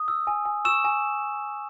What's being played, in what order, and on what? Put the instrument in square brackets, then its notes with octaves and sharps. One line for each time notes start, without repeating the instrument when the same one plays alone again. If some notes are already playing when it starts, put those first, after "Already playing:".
Already playing: [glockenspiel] D#6
E6
G#5
G#5
C#6 E6 E7
G#5